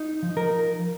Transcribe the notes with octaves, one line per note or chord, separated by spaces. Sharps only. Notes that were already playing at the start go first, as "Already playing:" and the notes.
Already playing: D#4
F3
A#4